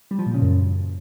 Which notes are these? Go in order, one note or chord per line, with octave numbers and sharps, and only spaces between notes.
G3
F3
A#2
C#3
F#2